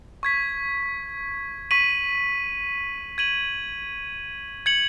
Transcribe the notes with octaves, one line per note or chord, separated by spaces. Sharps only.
C#6 G#6 B6
C#6 B6 D#7 F#7
G#6 D#7 F#7
G#6 C#7 F#7